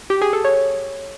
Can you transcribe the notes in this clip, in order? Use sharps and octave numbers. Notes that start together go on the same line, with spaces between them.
G4
G#4
A4
C#5